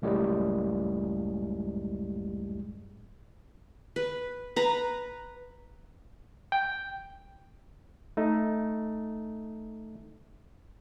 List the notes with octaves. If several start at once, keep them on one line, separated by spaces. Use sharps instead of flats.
C#2 F#2 A2 G3 G#3
B4
B4 A#5
G5
A3 D#4